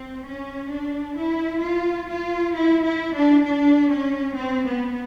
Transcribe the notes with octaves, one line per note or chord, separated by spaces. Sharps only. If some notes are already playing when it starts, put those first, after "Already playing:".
Already playing: C4
C#4
D4
E4
F4
F4
E4
E4
D4
D4
C#4
C4
B3